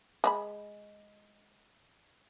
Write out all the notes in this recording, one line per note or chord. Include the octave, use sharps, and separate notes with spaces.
G#3 D5 B5